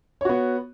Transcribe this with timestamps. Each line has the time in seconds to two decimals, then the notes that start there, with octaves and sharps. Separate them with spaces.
0.21 C#5
0.25 F#4
0.29 B3